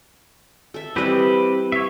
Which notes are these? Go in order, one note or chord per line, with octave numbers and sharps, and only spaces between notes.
A4 E5
E3 G3 C4 G4 B4 D#5
C#5 E5